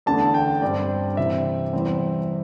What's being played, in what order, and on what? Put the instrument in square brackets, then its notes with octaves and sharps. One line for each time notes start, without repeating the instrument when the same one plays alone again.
[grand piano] E2 D3 A3 A5
G5
G2 G3 C4 D5
C3 E3 C4 E5
E2 E3 G3 C4